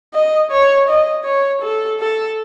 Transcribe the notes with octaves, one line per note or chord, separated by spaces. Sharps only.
D#5
C#5
D#5
C#5
A4
A4